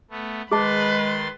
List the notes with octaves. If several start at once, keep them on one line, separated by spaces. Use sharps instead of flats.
A3 B3
D#3 G#3 G#4 B4 A5 C6 A6